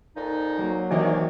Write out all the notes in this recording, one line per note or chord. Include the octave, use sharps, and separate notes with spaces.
F2 A#2 D#4
F#3 A#3
C3 D#3 E3 D#4 F#4 G4 D5 G#5